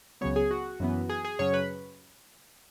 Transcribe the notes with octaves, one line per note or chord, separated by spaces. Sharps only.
C#2 C#3 F#3 B3 C#5
G#4
F#4
F#2 E3 B3
G#4
G#4
F#2 C#3 F#3 C#4 C#5
B4